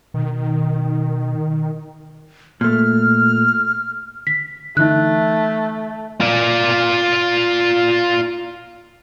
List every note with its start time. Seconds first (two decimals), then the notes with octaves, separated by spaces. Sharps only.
0.14 B2 D#3
2.61 A#2 A3 F6
4.27 B6
4.77 D3 E3 A3 D#4 F#6
6.21 F4 D5